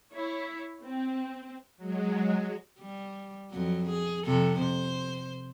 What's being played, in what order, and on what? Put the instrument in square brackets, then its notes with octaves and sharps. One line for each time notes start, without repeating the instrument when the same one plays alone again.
[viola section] E4 C#5
C4
[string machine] F#3 G#3
[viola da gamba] G3
F2 F#3
G#4
F2 C3 A4
C5